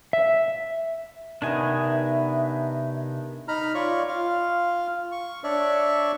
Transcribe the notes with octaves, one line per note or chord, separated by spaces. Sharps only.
E5
C3 D#3 B3 D4 D#4 E5 G#5 A#5
D#4 A#5 B5 F6
F4 C#5 D5 C#6
F4 F5
C#6
D4 C#5 D5 E5 C#6